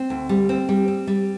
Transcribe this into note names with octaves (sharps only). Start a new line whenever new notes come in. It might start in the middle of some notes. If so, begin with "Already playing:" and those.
Already playing: C4
D2
G3
C4
G3
C4
G3